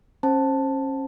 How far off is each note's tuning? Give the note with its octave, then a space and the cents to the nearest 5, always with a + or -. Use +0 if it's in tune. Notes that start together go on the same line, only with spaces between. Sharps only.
C#4 -30 C5 +15 A5 +0